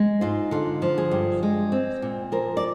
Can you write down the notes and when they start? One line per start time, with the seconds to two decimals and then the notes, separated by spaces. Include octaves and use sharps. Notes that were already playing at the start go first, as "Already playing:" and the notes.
Already playing: G#3
0.21 G#2 F4
0.51 D3 F4
0.82 F3
0.98 G#4
1.11 G2
1.43 G#3
1.72 C4
2.02 A#2
2.32 F3 A#4
2.57 D5